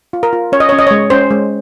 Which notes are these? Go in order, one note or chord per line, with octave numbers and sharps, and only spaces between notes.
F4
A#4
F4
C#4 C#5
D#5
C#4 C#5
D#5
C#5
G#3
C#4 C5
G#3